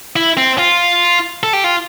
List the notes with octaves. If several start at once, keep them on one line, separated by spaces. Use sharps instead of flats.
E4
C4
F4
A4
G4
F4